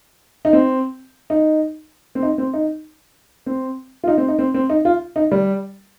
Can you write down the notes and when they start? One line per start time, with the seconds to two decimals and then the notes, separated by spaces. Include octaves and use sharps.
0.45 D#4
0.53 C4
1.30 D#4
2.15 C4
2.23 D#4
2.38 C4
2.53 D#4
3.46 C4
4.04 F4
4.08 D#4
4.18 C4
4.28 D#4
4.39 C4
4.54 C4
4.69 D#4
4.85 F4
5.16 D#4
5.32 G3